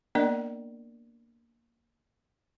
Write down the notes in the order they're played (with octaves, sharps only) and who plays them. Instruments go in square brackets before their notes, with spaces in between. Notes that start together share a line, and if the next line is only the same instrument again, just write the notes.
[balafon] A#3 B3 D4 A#4 D5 D#5